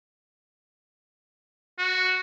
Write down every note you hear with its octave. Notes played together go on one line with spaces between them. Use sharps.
F#4